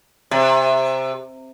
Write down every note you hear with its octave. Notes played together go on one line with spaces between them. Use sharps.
C3